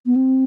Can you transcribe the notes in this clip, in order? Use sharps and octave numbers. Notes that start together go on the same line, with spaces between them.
B3
C4